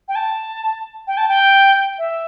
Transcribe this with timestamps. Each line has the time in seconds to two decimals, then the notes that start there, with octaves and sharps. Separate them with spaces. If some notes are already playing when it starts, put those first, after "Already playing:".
0.08 G5
0.16 A5
1.07 G5
1.17 A5
1.28 G5
1.98 E5